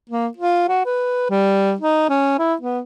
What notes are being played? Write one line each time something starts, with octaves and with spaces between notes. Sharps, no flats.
A#3
F4
F#4
B4
G3
D#4
C#4
E4
B3